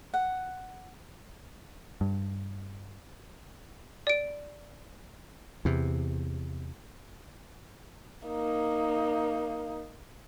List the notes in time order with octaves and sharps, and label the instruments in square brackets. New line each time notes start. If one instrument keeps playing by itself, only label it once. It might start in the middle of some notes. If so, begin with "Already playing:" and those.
[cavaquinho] F#5
[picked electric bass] G2
[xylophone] D5 D7
[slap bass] E2 C3
[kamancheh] A#3 D#4